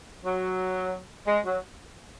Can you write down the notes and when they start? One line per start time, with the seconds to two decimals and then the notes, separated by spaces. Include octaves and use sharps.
0.25 F#3
1.27 G#3
1.45 F#3